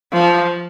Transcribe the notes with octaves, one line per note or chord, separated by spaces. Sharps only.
F3